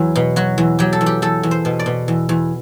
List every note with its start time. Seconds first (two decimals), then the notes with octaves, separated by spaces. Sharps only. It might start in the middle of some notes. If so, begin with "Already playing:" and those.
Already playing: E2 F#3
0.16 B2
0.36 F#3 F#4
0.58 E2
0.79 F#3 G4
0.93 A4
1.01 E2
1.06 G4
1.22 E2 A4
1.43 E2
1.51 C5
1.65 B2
1.79 D5
1.86 B2
2.08 E2
2.29 E2